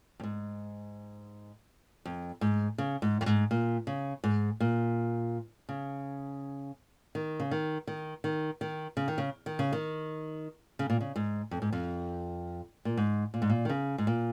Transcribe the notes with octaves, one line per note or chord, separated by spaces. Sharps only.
F2
G#2
F2
G#2
C#3
G#2
F2
G#2
A#2
C#3
G#2
A#2
C#3
D#3
C#3
D#3
D#3
D#3
D#3
C#3
D#3
C#3
D#3
C#3
D#3
C#3
A#2
C#3
G#2
F2
G#2
F2
A#2
G#2
A#2
G#2
A#2
D#3
C#3
G#2
A#2